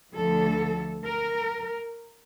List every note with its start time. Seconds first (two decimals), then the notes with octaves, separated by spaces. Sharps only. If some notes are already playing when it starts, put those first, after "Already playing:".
0.14 D2 D3 F3 A4
1.05 A#4